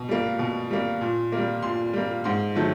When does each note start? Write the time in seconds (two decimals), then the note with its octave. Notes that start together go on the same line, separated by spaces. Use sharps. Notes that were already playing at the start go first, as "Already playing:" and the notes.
Already playing: B2
0.09 G3 A#3
0.39 B2
0.70 G3 A#3
1.01 A#2
1.32 G3 A#3
1.62 A#2 C6
1.93 G3 A#3
2.24 G#2 C6
2.55 D#3 F#3 A3